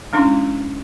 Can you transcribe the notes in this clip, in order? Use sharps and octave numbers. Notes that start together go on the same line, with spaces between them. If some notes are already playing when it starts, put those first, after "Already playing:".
G#3 C#4 D4 E4